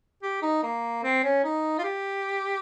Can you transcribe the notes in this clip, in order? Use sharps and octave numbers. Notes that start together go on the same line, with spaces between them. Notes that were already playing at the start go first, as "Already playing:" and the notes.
G4
D#4
A#3
C4
C#4
D#4
F4
G4